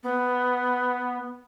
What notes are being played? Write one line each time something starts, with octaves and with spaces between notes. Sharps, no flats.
B3